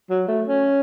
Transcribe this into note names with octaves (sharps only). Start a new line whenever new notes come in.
F#3
A3
C#4